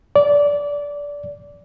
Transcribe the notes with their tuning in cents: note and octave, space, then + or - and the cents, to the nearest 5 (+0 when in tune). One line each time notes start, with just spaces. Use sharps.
D5 -20